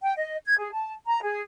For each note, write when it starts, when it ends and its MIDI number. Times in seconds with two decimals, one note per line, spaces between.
0.02 0.13 79
0.17 0.36 75
0.45 0.55 92
0.59 0.71 68
0.72 0.94 81
1.06 1.20 82
1.23 1.41 68